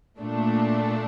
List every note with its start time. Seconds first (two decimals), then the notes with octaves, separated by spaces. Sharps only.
0.19 A#2 A3 D4